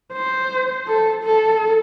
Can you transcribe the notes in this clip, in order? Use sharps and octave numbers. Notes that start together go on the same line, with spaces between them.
C5
A4
A4